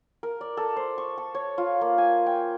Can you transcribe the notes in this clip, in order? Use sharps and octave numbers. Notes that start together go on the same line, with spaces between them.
A#4
D5
A4
C5
C#6
A5
C#5
F4
A#3
G#5
G5